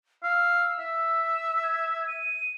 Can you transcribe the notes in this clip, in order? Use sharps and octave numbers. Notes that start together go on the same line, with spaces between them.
F5 E6
E5
G#6
D#7